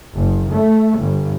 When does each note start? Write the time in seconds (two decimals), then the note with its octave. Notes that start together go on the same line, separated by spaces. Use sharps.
0.16 F#1
0.51 A3
1.00 G1